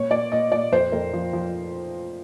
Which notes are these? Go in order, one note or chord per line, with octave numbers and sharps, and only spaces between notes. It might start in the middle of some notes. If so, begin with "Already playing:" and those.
Already playing: A#2 C#5
A#2 D5
A#2 D#5
A#2 D5
F2 C5
F2 A#4
F3
F3